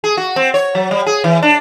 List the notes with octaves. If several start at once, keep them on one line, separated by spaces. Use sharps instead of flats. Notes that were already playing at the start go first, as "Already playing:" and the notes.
G#4
F#4
C4
C#5
F#3
G3
G#4
E3
D4